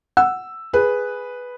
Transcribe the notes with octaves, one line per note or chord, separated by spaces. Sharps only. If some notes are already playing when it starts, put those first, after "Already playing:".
F#5 E6
G#4 B4